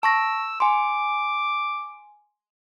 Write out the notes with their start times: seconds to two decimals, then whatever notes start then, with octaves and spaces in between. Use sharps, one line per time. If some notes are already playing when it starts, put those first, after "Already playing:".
0.03 A5 C#6 E6 A#6
0.60 G#5 C6 D6